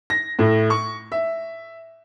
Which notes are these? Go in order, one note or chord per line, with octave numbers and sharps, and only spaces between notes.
A#6
A2
C#6
E5